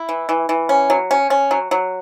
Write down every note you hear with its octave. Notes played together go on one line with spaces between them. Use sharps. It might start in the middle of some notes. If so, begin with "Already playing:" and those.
Already playing: E4
E3
E3
E3
C#4
F#3
C#4
C#4
F#3
F#3